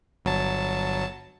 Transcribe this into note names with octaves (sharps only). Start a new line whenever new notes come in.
G1 F#3 A5